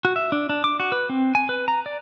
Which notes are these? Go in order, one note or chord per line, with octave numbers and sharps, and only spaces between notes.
F#4
E5
D4
D4
D6
F#4
B4
C4
G#5
B4
A#5
D5